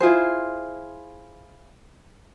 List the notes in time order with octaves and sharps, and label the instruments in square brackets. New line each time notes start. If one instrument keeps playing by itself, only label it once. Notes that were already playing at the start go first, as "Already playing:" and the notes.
[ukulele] E4 F4 G#4 C5